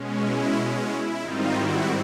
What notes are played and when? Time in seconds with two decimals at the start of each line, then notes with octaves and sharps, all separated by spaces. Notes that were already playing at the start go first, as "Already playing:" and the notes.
Already playing: B2 G#3 C#4
0.22 E4
0.88 E4
1.20 G#2 D#3 G3 C4 D#4 F4
1.53 E4 F#4